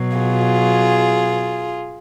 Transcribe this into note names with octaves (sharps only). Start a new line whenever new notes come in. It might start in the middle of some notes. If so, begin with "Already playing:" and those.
Already playing: B2 F#3
F4 G#4